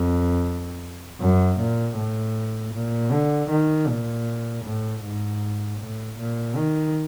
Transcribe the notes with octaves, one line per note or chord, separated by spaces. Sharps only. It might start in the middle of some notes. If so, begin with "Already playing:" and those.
Already playing: F2
F#2
A#2
A2
A#2
D3
D#3
A#2
A2
G#2
A2
A#2
D#3